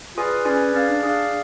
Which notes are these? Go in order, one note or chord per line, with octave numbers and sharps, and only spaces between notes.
F4 G#4 B4 D5 G#5
C#4 G#4 B4 D5 G#5
C#4 G#4 D5 F5
D4
D4 G#4 D5 F5